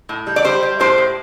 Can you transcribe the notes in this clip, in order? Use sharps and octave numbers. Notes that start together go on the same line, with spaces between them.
A2
G3
D5
G3 G4 C5
G3
A2 G4 C5
A2